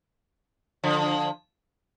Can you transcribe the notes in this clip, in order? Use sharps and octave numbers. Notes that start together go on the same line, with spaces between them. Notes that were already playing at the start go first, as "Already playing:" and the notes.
D3 F3